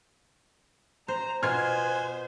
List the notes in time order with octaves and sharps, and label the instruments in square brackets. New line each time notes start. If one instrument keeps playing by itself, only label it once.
[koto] C5 [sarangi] A#5
[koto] B2 F4 [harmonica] B3 G#5 [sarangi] C5 [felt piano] F6 G#6